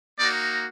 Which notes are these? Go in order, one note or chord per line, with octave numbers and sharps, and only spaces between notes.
A#3 D#4 F#4 D5